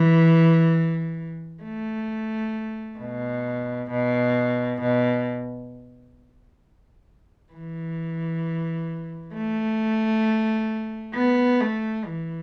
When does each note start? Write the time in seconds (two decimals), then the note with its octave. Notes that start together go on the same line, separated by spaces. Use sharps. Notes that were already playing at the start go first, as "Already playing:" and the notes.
Already playing: E3
1.63 A3
2.99 B2
3.90 B2
4.81 B2
7.53 E3
9.34 A3
11.15 B3
11.61 A3
12.05 E3